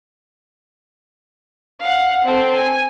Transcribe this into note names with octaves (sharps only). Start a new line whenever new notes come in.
F5 F#5
C4 A4
G#5